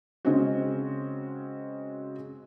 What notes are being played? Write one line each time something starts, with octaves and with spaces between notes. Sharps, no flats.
C#3 G#3 C4 C#4 F#4